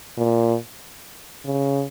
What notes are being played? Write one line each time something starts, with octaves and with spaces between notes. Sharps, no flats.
A#2
C#3